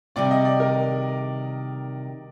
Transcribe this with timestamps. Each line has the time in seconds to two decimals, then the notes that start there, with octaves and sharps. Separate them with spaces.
0.16 C3 D#3 G3 D5
0.31 D#5
0.45 D5
0.60 A#4